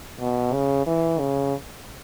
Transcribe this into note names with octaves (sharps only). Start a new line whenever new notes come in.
B2
C#3
E3
C#3